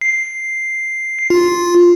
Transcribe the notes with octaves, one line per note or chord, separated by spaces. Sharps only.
C7
F4